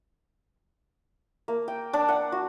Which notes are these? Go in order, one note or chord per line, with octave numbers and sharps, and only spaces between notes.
A#3
G5
D4
F#5
F#4